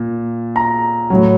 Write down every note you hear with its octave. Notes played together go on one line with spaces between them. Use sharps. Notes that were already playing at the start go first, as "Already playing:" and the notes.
Already playing: A#2
A#5
A2 F#3